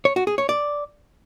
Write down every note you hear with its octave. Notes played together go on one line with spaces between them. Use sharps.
C#5
F#4
G#4
C#5
D5